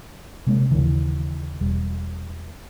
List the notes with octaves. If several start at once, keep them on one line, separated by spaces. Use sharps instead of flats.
C3 G#3 A#3 C#4
D#2 C#3 E3
E1 G3